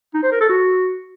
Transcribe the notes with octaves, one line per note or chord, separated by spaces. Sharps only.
D#4
C5
A#4
A4
F#4